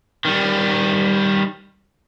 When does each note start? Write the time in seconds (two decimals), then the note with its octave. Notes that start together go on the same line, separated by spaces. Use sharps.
0.25 D#3 G3